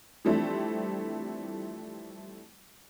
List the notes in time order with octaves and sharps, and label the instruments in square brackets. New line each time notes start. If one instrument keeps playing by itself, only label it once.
[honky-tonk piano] E3 F3 G3 A3 C4 D4